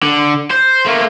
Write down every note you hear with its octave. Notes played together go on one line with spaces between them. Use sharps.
D3
C5
A3 A#3